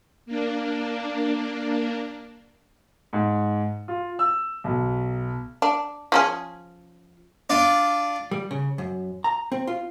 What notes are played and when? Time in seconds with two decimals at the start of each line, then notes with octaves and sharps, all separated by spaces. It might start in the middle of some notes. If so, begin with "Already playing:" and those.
0.26 A#3 D4
3.13 G#2
3.88 F4
4.19 E6
4.64 B1
5.62 D4
6.12 F3 C#4 G#4
7.50 D4 F4
8.31 G3
8.51 C#3
8.78 F#2
9.24 A#5
9.52 C4
9.67 F4